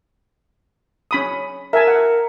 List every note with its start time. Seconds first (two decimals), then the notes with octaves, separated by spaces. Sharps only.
1.11 C#4 B5 D#6
1.73 A#4 E5 G#5 A5
1.87 F#5